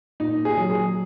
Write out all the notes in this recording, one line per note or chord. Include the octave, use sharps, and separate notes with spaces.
A#2 D#4
G#4
F#3
G#4